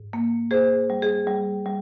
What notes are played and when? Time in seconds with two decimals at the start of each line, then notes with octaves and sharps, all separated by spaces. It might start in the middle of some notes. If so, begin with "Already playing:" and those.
Already playing: G#2
0.13 A#3
0.51 A#3 G#4 C5
0.90 G3
1.02 G#4
1.27 G3
1.66 G3